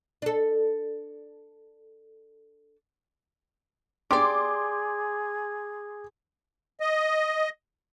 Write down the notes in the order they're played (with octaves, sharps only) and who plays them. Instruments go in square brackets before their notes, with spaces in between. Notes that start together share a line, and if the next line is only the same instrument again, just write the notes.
[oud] D4 A4
[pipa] G4 D5 [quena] G#4 [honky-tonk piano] C6 D6
[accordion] D#5